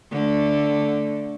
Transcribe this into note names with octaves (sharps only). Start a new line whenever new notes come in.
D3 A3